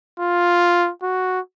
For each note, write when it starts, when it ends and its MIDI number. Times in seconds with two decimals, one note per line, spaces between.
0.20 0.91 65
1.03 1.40 66